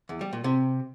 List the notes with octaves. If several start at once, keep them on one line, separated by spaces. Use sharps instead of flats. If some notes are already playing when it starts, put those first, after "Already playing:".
E2
G3
A#2
C3